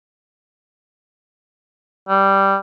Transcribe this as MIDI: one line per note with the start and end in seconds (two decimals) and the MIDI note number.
2.09 2.57 55